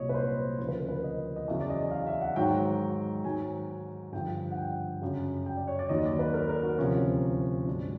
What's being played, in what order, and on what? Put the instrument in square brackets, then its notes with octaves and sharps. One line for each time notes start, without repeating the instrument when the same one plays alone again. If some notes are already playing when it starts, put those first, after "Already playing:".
Already playing: [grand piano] C2 A#2 F#3 C#5 D#5
B4
C5
D2 C#3 F3 C5
B4
A#4
B4
D#5
D#5
E2 C#3 F#3 E5
D5
D#5
F5
E5
F#5
G#2 D#3 F#3 G5
G#2 D#3 F#3 G#5
G2 D3 F3 G5
F#5
G5
F#2 C#3 F#3
G5
D5
C#5
D5
D#2 D#3 F#3 D#5
D5
B4
A#4
A#4
F#4
D2 C3 F3 C#4
G#2 D#3 F#3 D4